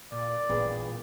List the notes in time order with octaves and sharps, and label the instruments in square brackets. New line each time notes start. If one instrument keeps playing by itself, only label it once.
[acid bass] A#2 [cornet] D5
[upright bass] A1 [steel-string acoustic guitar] G2 B3 G#4 [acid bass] A#2